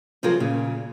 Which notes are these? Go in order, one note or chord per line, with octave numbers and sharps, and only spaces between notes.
C3 F3 F#3 F4 G#4 A#4
A#2 C#3